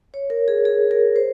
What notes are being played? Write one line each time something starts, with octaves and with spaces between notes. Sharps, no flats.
C#5
A#4
G#4
G#4
A#4
C5